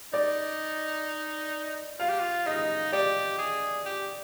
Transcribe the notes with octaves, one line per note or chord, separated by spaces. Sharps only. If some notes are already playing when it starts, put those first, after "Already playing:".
D#4 D5
F4 F5
G4
F4
D#4 D#5
G4 D5
G#4
G4